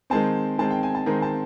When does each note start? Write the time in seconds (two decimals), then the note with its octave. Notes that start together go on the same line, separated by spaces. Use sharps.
0.10 D#3 G#3 C4 A5
0.58 D#3 G#3 C4 A5
0.71 G5
0.83 G#5
0.95 A5
1.06 D#3 G#3 C4 A#5
1.22 A5